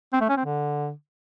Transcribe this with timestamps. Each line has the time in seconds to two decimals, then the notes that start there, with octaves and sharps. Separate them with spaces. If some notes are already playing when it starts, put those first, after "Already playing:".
0.13 C4
0.21 A3
0.29 C#4
0.37 C4
0.45 D3